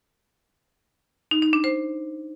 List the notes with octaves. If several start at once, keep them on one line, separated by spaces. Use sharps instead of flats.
D#4
D#4
D4
C5